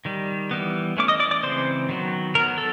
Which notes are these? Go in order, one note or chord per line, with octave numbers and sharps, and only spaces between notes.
D#3 G3
E3 G3 B3
E3 A3 C#4 D6
D#5 D#6
D5 D6
D5 D6
C#3 E3 G#3 C4 C5 C6
D#3 F#3 B3
D#3 F#3 B3 A#4 A#5
A4